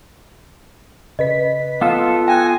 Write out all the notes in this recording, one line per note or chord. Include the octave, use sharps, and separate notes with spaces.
C#3 B4 D#5 B6
B3 F4 A4 F5
G5 G#5 F#6 A#6